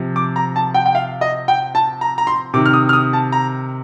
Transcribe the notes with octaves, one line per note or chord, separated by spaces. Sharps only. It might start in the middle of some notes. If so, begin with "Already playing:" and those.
Already playing: C3 F3
D6
A#5
A5
G5
G5
F5
D#5
G5
A5
A#5
A#5
C6
C3 D#3 D6
F6
D#6
F6
D#6
A5
A#5